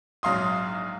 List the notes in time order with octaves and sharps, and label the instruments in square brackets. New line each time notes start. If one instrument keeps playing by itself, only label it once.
[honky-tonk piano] A#1 G#2 F#3 F5 C6 D#6